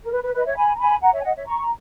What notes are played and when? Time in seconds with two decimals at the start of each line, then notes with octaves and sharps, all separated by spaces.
0.03 A#4
0.11 B4
0.23 B4
0.34 B4 D#5
0.45 C#5 E5
0.56 G#5 B5
0.75 A#5
0.79 G#5 B5
1.02 F#5 A#5
1.13 C#5 E5
1.19 G#5
1.24 D#5 F#5
1.35 C#5 E5
1.46 A#5 C#6
1.61 A#5